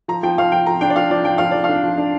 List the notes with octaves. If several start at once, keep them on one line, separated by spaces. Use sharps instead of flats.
F3 A#5
F3 G5
F3 F5
F3 G5
F3 A#5
D4 G5
D5
F3 F5
F3 D5
F3 G5
F3 F5
F3 D5
F5
D4
F3
D4